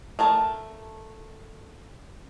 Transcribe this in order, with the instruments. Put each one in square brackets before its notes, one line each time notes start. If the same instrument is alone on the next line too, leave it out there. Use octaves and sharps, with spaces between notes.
[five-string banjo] A3 A#4 A5